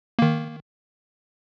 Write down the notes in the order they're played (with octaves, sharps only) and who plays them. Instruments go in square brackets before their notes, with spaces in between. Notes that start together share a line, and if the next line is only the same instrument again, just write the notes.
[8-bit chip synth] D#3 A#3